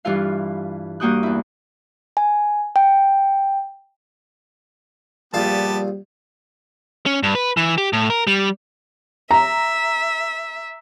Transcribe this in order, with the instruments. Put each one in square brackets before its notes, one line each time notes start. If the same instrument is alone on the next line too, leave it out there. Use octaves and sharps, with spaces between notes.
[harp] G2 E3 E4 F4 F5
G2 A#3 F#4 G5 D#6 F#6
E2 E4
[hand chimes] G#5
G5
[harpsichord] A#1 F4 [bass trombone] G3 [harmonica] B3 G4 A5
[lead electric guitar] C#4
G2
B4
E3
G4
A2
A#4
G3
[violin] E5 [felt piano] A#5